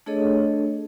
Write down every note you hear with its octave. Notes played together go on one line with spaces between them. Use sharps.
A3 D4 G#4 A4 C#5 D#5